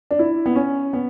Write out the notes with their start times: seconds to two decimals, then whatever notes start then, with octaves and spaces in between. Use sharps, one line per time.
0.11 D4
0.19 E4
0.46 B3
0.56 C#4
0.93 B3